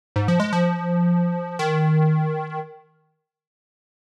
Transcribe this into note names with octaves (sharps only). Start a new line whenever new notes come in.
G#2
F3
G#3
F3
D#3